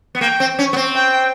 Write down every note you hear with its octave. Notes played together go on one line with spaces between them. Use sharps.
B3
A#3 G5
C4
C#4
B3
C4
G5